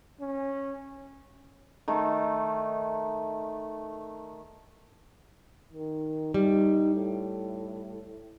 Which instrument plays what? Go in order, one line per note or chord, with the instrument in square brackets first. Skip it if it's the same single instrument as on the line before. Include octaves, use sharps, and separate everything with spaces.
[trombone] C#4
[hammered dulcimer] D#3 A3
[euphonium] D#3
[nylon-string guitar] G3 [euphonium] D#4
[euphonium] A2